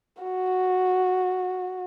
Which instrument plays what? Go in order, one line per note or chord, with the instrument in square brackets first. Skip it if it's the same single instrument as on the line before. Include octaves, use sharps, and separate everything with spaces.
[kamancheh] F#4